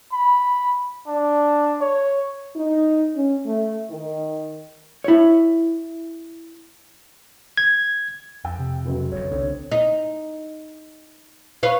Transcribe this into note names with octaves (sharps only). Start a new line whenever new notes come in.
B5
D4
C#5
D#4
C#4
A3
D#3
E4 C#5
G#6
F2 G5 E6
C3
F1 C#2 F#3
F#1 F#2 C#5
C2 D3 C4
D#4
B4 C#5 F5